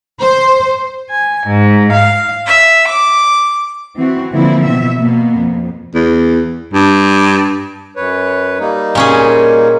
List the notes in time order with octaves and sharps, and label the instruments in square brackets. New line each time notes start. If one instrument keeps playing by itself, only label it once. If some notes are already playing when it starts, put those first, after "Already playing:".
[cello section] C5
[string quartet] G#5
G#2
F5
E5
D6
[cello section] E3 C4 F#4
D3 E3 F3 A#3 C4 E4
B2 E5
B2 A#3 B3
F2
[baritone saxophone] E2
G2
[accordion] F#2 B4 C#5
G3 A#3 D#4
[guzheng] A#2 C#4 G#4